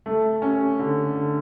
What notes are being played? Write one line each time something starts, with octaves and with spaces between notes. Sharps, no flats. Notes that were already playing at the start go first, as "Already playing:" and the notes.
A3
C#4
D3
D3